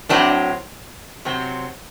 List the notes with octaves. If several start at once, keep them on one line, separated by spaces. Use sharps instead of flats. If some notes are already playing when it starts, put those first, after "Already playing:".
A2 F#3 C4 D4
C3 F#3 C4